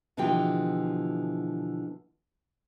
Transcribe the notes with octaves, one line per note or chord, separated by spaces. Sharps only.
B2 D3 E3 F3 G4 G5